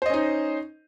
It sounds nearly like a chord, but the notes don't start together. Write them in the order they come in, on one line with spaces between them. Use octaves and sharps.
C5 D#5 C#4 D#4